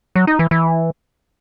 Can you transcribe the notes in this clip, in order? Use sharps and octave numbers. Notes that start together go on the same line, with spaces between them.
F#3
D#4
E3
E3